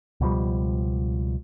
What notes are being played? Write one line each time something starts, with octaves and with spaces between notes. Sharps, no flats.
C#2 B2 F3 G3